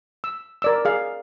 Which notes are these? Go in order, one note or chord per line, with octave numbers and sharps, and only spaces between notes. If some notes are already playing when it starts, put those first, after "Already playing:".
E6
A#4 D5 E6
G#4 F5